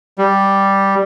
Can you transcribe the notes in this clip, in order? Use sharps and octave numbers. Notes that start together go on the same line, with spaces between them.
G3